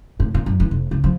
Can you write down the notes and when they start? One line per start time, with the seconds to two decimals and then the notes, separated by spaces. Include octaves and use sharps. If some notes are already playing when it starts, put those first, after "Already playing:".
0.20 A2
0.34 A#2
0.46 F#2
0.60 E3
0.71 F1
0.91 C#2
1.04 F3